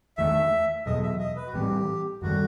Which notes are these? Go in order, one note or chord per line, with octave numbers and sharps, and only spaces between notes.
E2 D#3 A3 E5
E2 B2 F#3 D#5
E5
D#5
B4
F#4
A2 E3 G3 C4 G4
F#2 D#3 G3 F#4